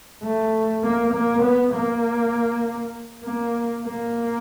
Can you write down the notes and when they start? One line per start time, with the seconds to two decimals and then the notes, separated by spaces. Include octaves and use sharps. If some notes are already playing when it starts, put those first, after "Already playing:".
0.23 A3
0.83 A#3
1.14 A#3
1.43 B3
1.74 A#3
3.24 A#3
3.84 A#3